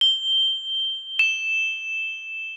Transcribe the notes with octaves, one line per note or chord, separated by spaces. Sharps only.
G7
E7